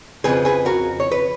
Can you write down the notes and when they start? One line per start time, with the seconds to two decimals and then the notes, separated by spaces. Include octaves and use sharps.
0.24 F2 C#3 F3 G#4 B4
0.45 G#4 B4
0.66 F#4 A#4
1.00 C#5
1.12 B4